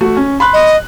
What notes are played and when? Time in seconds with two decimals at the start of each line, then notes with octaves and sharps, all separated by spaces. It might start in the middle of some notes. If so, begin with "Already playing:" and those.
0.01 A3 F#4
0.17 C#4
0.40 B5 C6 F#6
0.53 D#5